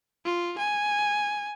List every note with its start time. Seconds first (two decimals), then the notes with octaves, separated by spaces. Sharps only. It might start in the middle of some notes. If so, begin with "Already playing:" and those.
0.25 F4
0.58 G#5